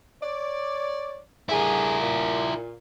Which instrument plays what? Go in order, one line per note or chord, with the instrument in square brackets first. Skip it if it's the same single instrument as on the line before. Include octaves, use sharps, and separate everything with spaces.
[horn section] C#5 D5
[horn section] D3 G#4 [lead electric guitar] E4 A#4
[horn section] A#2